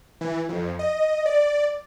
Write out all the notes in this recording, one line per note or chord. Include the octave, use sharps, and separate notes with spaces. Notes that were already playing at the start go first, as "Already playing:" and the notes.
E3
F2
D#5
D5